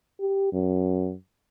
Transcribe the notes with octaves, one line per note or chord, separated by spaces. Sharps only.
G4
F#2